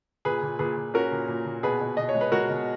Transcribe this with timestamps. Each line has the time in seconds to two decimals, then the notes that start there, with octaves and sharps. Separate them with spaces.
0.25 A#2 G#4 B4
0.43 A#2
0.59 A#2 G#4 B4
0.77 A#2
0.94 C#4 F#4 A#4
1.12 A#2
1.28 A#2
1.45 A#2
1.63 B2 G#4 B4
1.81 B2
1.97 B2 D#5
2.09 C#5
2.15 G#3
2.21 B4
2.32 G#3 F#4 A#4
2.50 B2